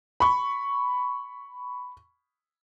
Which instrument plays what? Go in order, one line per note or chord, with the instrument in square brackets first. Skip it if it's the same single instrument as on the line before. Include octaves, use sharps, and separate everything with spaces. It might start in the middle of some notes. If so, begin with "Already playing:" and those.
[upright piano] B5 C#6